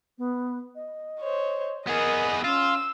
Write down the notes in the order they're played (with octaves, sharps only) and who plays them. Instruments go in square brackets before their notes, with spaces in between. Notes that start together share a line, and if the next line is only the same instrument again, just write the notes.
[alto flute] B3
D#5
[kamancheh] C5 C#5
[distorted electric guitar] B3 G#4 [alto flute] A#4 [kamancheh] D#5
[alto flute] C#4 [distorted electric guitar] F4 [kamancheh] E6